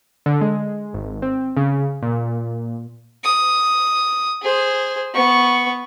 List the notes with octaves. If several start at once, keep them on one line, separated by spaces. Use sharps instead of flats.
D3
G#3
G#1
C4
C#3
A#2
D#6
G#4 C5
B3 C#6